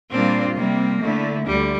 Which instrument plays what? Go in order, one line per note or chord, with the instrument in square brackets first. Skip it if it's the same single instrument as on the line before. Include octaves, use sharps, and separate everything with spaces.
[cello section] A#2 G3 A#3 D4 F4 [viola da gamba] C4
[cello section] C3 G3 C4 [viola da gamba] A#3
[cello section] D3 A3 E4
[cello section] D2 D3 [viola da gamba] G3